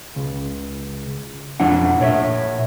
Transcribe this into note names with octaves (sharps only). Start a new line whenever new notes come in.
C#2
F2 F3 D4 E4 F#5
A#2 C#5 D5 E5